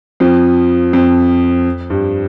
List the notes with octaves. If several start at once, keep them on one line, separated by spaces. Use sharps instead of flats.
F2 F3
F2 F3
G2